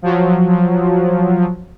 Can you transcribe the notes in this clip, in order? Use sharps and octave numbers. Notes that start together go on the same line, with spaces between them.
F3 F#3